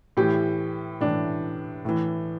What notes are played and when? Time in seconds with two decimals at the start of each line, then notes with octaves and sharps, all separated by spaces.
0.17 A2 E3 G4
1.00 A2 E3 D4
1.85 A2 E3